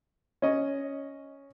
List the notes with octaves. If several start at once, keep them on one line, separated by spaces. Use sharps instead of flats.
C#4 D#5